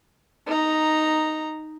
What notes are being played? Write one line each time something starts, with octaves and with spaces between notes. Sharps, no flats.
D#4 A#5